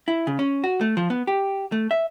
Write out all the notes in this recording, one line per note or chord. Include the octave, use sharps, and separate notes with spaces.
E4
C#3
C#4
F#4
A3
F3
B3
G4
A3
E5